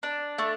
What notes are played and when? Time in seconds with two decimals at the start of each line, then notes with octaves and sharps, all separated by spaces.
0.03 D4
0.38 A3